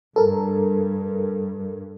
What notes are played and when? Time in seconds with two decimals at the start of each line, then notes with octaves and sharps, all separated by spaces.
0.16 G2 A4 A#4